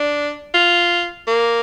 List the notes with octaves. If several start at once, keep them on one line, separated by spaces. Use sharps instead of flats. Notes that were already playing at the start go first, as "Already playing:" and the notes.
Already playing: D4
F4
A#3